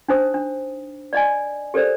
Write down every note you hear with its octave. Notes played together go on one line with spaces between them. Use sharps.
D4 D#4 C5 D#6
D4
D5 D#5 G#5
G4 A4 A#4 C5 D5